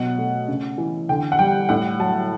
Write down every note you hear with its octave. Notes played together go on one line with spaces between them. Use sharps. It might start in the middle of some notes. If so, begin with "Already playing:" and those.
Already playing: B2 F#3 F#5
A3
C#3
E3
D3 G5
F#5
G3 G5
A2 F#5
F#3 A5